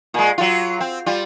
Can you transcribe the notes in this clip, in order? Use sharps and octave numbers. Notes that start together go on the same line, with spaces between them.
A#2 G#3
F#3 F4
C4
G3 F4